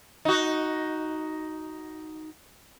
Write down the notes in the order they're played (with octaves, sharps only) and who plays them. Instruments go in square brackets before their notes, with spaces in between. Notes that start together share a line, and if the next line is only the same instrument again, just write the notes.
[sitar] D#4 F#4